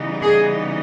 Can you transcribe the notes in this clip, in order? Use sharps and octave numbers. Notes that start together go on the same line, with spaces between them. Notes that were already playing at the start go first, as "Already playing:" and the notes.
Already playing: C#3 E3 G3 B3 D#4
G#4